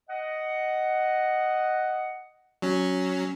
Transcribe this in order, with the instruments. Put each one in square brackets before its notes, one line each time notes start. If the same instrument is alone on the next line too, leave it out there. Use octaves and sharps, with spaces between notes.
[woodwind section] D#5 F#5
[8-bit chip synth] F#3 C#4